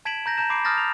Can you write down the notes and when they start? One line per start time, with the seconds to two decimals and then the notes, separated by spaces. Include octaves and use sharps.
0.05 A5 G#6 B6 D7 E7 F#7
0.26 A#5 G6 A#6
0.38 A5 A#5 G6 E7
0.50 B5 D6 C7 D7
0.65 A5 D#6 F6 G6 A6 A#6
0.78 F7